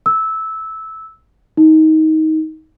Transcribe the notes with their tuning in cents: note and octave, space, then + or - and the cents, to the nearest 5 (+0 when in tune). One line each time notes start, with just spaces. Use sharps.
E6 -15
D#4 +20